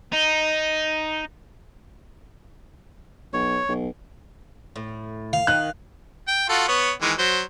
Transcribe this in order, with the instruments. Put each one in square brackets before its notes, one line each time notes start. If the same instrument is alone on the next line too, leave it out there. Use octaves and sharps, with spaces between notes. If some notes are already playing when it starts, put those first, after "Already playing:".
[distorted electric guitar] D#4
[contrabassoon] B1 [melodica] C#5
[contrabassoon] B1
[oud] A2
[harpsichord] F5
[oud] D#3 D#4 [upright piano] F#6
[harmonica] G5
F4 F#4 A4
B3 C#5
D#3 E3 G#3
F#3 C5